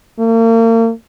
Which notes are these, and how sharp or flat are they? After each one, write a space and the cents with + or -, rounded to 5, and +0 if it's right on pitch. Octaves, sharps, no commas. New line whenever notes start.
A#3 -40